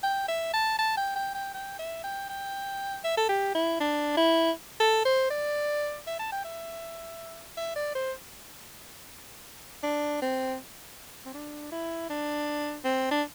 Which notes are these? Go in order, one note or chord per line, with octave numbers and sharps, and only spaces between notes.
G5
E5
A5
A5
G5
G5
G5
G5
E5
G5
G5
E5
A4
G4
E4
D4
E4
A4
C5
D5
E5
A5
G5
E5
E5
D5
C5
D4
C4
C4
D4
E4
D4
C4
D4